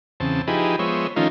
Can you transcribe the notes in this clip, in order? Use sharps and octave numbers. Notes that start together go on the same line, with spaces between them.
E2 C#3 C4 A5
F3 D#4 E4 G4 G#4 B4
F3 G#3 B3 C5 C#5 E5
D#3 F3 A3 C#4 D#4 F4